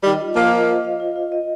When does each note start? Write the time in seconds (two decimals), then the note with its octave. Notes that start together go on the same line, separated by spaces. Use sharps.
0.03 D#3 G3 D#5
0.20 F4
0.36 F3 A#3 F4
0.52 D#5
0.67 C5
0.85 F5
1.00 F4
1.16 F4
1.32 D#5